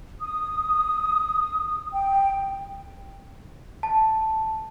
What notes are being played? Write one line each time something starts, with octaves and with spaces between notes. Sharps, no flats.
D#6
G5
A5